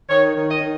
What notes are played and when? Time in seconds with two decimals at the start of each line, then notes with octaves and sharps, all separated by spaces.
0.09 D#3 C#5
0.35 D#3
0.49 D#5
0.60 D#3